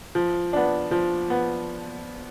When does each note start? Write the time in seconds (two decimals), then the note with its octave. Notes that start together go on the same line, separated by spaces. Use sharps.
0.15 F3
0.53 B3 D4
0.91 F3
1.30 B3